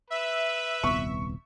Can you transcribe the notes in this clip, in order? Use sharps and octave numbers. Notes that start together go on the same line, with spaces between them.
B4 E5
D#1 C2 B3 C#6